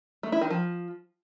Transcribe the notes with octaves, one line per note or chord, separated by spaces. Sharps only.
A3
E4
D#3
F3